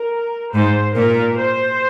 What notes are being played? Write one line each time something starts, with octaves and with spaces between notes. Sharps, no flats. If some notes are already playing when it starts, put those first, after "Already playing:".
Already playing: A#4
G#2 C5
A#2 A#4
C5